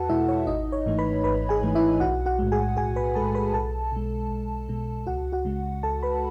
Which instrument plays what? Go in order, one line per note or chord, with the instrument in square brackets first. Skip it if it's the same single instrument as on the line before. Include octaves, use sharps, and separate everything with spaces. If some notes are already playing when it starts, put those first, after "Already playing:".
Already playing: [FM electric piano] E2 F#4 A4 B4 F#5 A5
B2 G#3 E4 E5
C#5
G#1 D#4 D#5
C#5
G#2 E3 A3
B4 B5
G#1 B4 B5
G#4 G#5
G#2 E3 A3
E4 E5
B1 F#4 F#5
F#4 F#5
A2 G#3
G#4 G#5
B1 G#4 G#5
B4 B5
A2 G#3 A4 A5
B4 B5
B1 A4 A5
B2 G#3
B1
B2 G#3
C#2 F#4 F#5
F#4 F#5
C#3 G#3
C#2 A4 A5
B4 B5